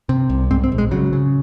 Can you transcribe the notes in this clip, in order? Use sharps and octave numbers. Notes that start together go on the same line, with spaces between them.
C3
C2
G#2 C4
C4
A#1
G#3
C#3 F#3
C#3